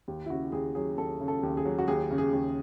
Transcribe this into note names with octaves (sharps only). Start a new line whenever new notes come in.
D#2
E4
C#3 F#4
D#2 G#4
F#3 G#4
D#2 A4
C#3
A4
D#2
G#4
F#3
F#4
D#2 G#4
C#3
G#4
D#2